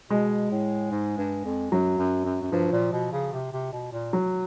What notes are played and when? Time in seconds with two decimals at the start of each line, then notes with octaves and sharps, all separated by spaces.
0.10 B2 G#3
0.51 A2
0.91 G#2
1.18 G2
1.44 F2
1.71 F#2 F#3
1.98 F#2
2.25 F#2
2.42 F#2
2.51 G2 F3
2.72 A#2
2.93 B2
3.12 C#3
3.33 C3
3.52 C3
3.73 B2
3.92 A#2
4.13 F#3